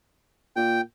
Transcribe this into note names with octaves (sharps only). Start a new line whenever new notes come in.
A#2 G5